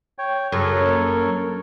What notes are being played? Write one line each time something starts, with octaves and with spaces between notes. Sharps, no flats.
C#5 G5
F#2 C#3 A4 A#4 C#5
A#3